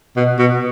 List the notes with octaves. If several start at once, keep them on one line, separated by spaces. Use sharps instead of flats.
B2
B2